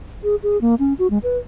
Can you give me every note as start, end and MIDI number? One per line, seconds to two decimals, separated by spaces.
0.24 0.35 68
0.43 0.60 68
0.61 0.75 58
0.79 0.94 61
0.99 1.07 66
1.10 1.18 56
1.23 1.38 71